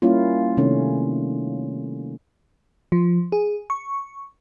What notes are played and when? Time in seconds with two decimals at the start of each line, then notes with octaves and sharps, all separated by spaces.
0.02 G3 A#3 C#4 E4 F4
0.57 C3 D#3 A3 C#4
2.92 F3
3.32 G#4
3.70 C#6